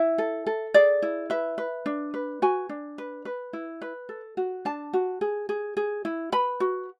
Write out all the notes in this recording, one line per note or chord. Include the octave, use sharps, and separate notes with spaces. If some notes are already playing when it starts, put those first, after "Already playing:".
Already playing: E4 E5
A4
A4
G#4 D5
E4
B4 E5
B4
D4
B4
F#4 G#5
D4
B4
B4
E4
B4
A4
F#4
D4 A5
F#4
G#4
G#4
G#4
E4
B4 B5
F#4